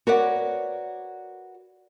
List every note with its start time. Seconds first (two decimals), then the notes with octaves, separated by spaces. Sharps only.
0.07 F#4 A#4 B4 C#5 D5 F#5